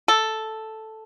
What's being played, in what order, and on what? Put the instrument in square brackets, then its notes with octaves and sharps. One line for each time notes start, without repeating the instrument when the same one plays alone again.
[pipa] A4